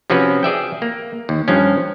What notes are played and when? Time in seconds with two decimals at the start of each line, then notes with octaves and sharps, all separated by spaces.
0.10 C3 F3 C#4 F#4 B4
0.43 G#4 D5 E5 G5
0.82 A#3
1.29 D#2
1.48 G2 F3 C#4